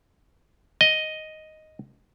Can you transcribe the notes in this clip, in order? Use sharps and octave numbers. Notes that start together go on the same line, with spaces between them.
D#5